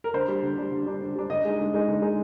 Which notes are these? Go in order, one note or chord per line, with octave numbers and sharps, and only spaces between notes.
A#4
D3 C5
G3 D4
D3
G3 D4
D3
G3 D4
D3
G3 D4
D3 D#5
G#3 D#4
D3
G#3 D#4
D3
G#3 D#4